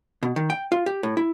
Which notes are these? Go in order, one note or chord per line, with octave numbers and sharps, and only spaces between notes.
B2
D#3
G5
F4
G4
A2
E4